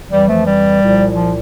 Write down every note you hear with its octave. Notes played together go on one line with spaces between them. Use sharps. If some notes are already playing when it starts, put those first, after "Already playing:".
F2 E3 G3
F3 A3
G3
C2 A#2 F3
F3